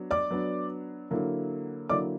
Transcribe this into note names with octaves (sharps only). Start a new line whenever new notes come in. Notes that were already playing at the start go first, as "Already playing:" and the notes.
Already playing: F#3 B3 D4
D5 D6
F#3 B3 D4
D3 F#3 A#3 E4
D3 F#3 A#3 E4 D5 D6